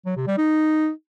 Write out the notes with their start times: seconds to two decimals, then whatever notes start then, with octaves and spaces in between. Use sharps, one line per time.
0.06 F#3
0.16 C3
0.27 G3
0.38 D#4